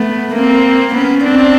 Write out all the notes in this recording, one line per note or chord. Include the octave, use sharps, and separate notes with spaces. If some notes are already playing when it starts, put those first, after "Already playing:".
Already playing: A3 B3
A#3 C4
B3 C#4
C4 D4